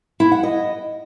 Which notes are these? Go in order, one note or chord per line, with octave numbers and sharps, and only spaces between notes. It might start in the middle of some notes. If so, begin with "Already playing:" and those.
E4
F#5
D#5